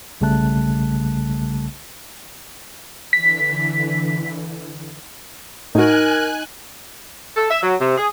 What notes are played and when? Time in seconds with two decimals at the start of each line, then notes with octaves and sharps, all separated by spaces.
0.21 B1 C#3 G3 A3 A5 F#6
3.13 D3 E3 B6
5.75 A2 D#4 F#4 A#4 G#5 F#6
7.36 A4
7.50 E5
7.62 F#3
7.80 C3
7.97 G#4